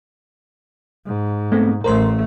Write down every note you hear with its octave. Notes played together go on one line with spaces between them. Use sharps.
G#2
A3 B3 C4
A1 A3 A#4 C5 C6